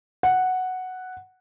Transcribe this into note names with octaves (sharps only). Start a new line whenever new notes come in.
F#5